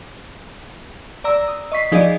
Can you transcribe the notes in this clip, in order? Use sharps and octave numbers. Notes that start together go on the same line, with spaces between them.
D5 A#5 E6
D#6
D#5 C#6 B6 C7
F3 D#4 G#4 D5 D#5